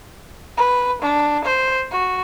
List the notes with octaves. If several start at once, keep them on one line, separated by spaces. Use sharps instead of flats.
B4
D4
C5
F#4